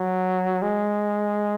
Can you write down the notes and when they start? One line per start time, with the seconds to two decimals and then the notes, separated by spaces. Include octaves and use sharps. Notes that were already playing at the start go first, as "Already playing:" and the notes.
Already playing: F#3
0.62 G#3